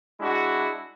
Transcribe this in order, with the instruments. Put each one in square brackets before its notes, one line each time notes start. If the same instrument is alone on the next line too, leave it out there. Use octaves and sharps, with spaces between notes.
[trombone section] G#3 D4 E4 F#4